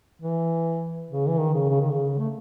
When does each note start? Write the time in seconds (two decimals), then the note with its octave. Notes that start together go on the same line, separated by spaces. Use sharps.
0.22 E3
1.11 C#3
1.28 E3
1.39 D#3
1.54 C#3
1.69 C#3
1.81 D#3
1.91 C#3
2.19 A3